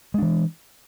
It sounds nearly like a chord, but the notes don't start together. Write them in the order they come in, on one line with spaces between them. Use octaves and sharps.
G#3 D4 E3